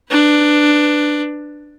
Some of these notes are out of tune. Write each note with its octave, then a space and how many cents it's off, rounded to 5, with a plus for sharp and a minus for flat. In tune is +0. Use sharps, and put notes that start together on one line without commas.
D4 +10 B4 +10